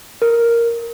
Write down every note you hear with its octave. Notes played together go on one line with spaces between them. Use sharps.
A#4